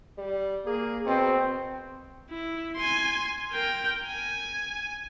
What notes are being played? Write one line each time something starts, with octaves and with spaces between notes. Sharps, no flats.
G3
A#3 G#4
B2 C4
E4
G#5 C6
A#4 G5
G#5